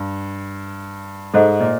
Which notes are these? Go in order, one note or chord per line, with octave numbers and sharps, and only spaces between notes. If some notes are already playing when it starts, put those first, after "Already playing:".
Already playing: G2
G#2 A4 C5 D#5 F#5
A#2